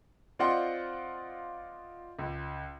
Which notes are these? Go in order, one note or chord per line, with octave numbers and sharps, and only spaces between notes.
C4 F4 D5 D#5 F#5 C6
C#2